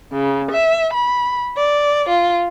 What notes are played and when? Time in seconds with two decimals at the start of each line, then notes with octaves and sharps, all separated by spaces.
0.12 C#3
0.50 E5
0.93 B5
1.57 D5
2.08 F4